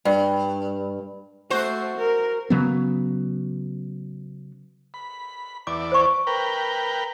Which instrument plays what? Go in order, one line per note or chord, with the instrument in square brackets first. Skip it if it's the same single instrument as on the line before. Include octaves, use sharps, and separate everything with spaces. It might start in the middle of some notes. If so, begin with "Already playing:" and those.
[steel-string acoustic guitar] G2
[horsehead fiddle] A3 [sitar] F#4 C5
[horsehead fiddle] A#4
[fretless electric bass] C#3 F#3 B3
[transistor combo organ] B5
[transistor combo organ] E2 D5 [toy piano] D6
[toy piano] C5 C#6
[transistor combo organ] A#4 B4 G5